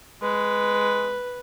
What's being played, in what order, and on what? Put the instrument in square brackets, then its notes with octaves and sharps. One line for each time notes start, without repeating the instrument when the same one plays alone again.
[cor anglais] G#3 [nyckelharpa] B4